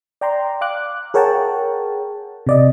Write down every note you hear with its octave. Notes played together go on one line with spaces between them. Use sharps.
D5 G5 A#5 C6
F5 D6 F#6
G#4 A#4 C#5 F#5 G5 A5
C3 D5 D#5